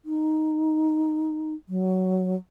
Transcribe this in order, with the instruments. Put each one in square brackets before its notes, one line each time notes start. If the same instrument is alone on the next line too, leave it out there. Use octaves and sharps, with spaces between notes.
[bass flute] D#4
F#3